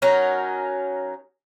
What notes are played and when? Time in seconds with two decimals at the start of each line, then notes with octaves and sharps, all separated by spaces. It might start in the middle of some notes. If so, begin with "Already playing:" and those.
0.02 F#3 C#4 D#4 A#4